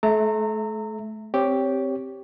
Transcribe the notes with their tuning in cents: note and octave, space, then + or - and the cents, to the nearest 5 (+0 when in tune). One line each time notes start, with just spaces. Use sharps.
A3 -35 E5 +0 A#5 -30
C4 +0 G4 +0 C#5 +15